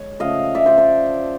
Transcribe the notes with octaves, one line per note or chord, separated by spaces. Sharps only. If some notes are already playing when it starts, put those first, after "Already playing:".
Already playing: G#3 C#5
C#3 F3 A3 D#5 F5
D5 E5
C5 D5
C5 D5